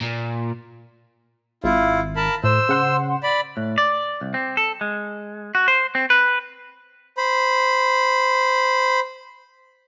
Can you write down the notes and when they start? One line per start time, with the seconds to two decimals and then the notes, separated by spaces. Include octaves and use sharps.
0.01 A#2
1.64 G#1 E4 F4
2.16 A#4 A5 B5
2.44 A2 C5 E6
2.69 C#3 F#5 C6
3.23 D5 B5
3.57 A2
3.78 D5
4.21 C2
4.34 C4
4.57 A4
4.81 G#3
5.55 F#4
5.68 C5
5.95 C4
6.10 B4
7.17 C5 B5